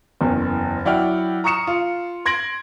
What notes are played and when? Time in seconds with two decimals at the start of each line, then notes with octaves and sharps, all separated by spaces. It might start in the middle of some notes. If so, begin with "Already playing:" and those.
0.21 F#1 E2
0.85 F#3 E4 D5 F#5 G5 F6
1.44 A#5 C#6 D#6 C#7 E7
1.67 F4
2.26 C6 G#6 A#6 D7 F#7